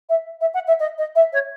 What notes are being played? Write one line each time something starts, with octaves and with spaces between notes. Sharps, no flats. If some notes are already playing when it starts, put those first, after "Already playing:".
E5
E5
F#5
E5
D#5
D#5
E5
C#5